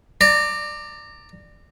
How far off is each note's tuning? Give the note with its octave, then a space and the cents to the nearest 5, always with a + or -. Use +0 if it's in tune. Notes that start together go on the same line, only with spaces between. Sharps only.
D5 +15 A#5 -25